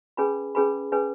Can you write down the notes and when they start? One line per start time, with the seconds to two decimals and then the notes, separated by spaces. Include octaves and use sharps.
0.17 C#4 G#4 B4 G#5 B5
0.55 C#4 G#4 B4 G#5 B5
0.92 C#4 G#4 B4 G#5